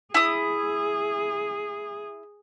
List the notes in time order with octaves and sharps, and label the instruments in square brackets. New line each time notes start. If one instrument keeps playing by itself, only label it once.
[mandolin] E4 D#6 [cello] G#4